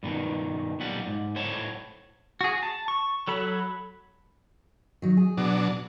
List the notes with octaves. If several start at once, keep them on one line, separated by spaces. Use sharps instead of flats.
G2 B2 D#3
B1 A#2 G3 F#5
G#2
A2 C5 C#5 F#5 A5
F#4 G#4
A5
C#6
F#3 A4 B5
D#3 F#3
G#4
B2 F#3 D4